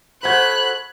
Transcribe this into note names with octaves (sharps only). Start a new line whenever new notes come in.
A3 F#4 A4 C5 B5 F#6 G#6